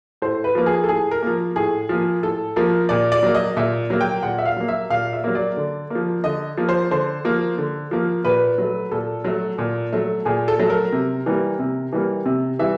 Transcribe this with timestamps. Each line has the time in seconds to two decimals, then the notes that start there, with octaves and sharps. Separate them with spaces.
0.22 A2 C5
0.44 B4
0.55 F3 A#3
0.66 G#4
0.84 A4
0.89 A2 G#4
1.11 A#4
1.23 F3 A#3
1.56 A2 G#4
1.89 F3 A#3
2.23 A2 A4
2.56 F3 A#3 A#4
2.89 A#2 D5
3.12 D5
3.23 F#3 A#3
3.35 D#5
3.57 A#2 E5
3.90 F#3 A#3
4.01 G5
4.23 A#2 F#5
4.38 E5
4.45 F5
4.57 F#3 A#3
4.68 E5
4.90 A#2 F5
5.13 E5
5.24 F#3 A#3
5.35 D5
5.57 D3
5.90 F3 A#3
6.24 D3 D#5
6.57 F3 A#3
6.69 C5
6.91 D3 C5
7.24 F3 A#3
7.58 D3
7.91 F3 A#3
8.25 A#2 B4
8.58 F#3 A3
8.91 A#2 A4
9.24 F#3 A3
9.58 A#2
9.92 F#3 A3
10.25 A#2 G#4
10.48 A4
10.59 F#3 A3
10.70 A#4
10.93 C3
11.26 E3 G3 A#3
11.59 C3
11.93 E3 G3 A#3
12.26 C3
12.59 E3 G3 E5